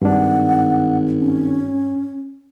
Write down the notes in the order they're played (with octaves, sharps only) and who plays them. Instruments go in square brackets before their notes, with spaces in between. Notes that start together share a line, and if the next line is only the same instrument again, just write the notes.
[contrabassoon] G#1 [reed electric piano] G2 D4 [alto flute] F#5
[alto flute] C#4